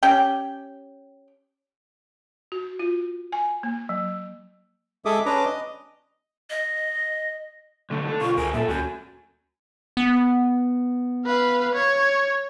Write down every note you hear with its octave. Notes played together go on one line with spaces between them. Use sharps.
C#4 G4 G5
F#4
F4
G#5
A#3
F#3
G#3 G#4 A4 E5 D6 D#6
C#4 D4 B4 A#5 D6
D#5
D#5
B1 D3 A3
A4 D5
B2 D3 F4 C#6
D2 G#4 A#4 G#5
F#2 A#2 A4 E5
D2 C#4 F#4 G#5
B3
B4 F5
C#5